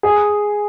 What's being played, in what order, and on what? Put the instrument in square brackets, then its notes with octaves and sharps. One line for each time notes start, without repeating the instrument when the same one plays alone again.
[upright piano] G#4